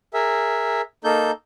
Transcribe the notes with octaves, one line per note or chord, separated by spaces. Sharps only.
G#4 A#4 E5
A#3 D#4 A4 G6